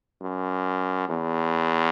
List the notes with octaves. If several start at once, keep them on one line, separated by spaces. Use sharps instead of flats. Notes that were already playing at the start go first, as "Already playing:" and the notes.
F#2
E2